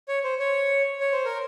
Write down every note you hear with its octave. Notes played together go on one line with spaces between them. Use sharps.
C#5
C5
C#5
C#5
C5
A#4